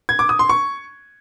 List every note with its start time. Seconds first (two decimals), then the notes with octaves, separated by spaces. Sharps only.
0.09 G#6
0.19 D6
0.29 D#6
0.39 C6
0.49 C#6